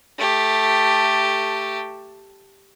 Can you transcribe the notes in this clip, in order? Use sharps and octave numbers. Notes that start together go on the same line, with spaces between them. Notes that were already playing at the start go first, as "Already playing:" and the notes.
A3 G4